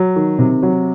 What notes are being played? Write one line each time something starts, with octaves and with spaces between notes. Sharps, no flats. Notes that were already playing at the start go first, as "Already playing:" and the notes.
Already playing: F#3
D#3
C3
F#3